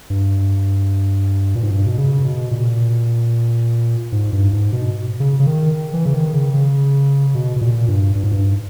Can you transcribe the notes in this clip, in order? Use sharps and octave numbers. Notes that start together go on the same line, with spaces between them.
G2
A#2
G#2
G2
B2
C#3
B2
A#2
G#2
G2
G#2
B2
C#3
C#3
D#3
E3
C#3
D#3
C#3
C#3
B2
B2
A#2
G2
G2
G#2
G2